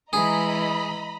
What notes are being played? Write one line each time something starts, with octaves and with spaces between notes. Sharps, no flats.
E3 G#3 G#4 D#5 A#5 B5